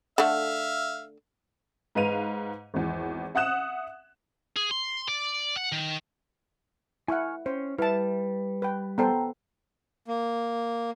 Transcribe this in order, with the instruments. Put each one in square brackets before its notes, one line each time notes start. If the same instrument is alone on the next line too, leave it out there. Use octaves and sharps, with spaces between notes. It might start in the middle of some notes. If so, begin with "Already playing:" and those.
[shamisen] D3 A3 [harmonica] E5 F5
[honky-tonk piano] G#2 B4 F5 D#7 F7
G#1 E2
E5 F#5 D#6 F#6 E7
[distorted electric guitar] G#4
C6
D5
F#5
D#3
[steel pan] E4 F#5 [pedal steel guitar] G#5 C#6 F6
[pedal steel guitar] C#4 [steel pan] C5
[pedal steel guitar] G3 [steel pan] E4 A5 [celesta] B4
[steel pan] B4 G5
[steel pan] B3 A4 C5 [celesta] G5 A#5
[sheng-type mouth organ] A#3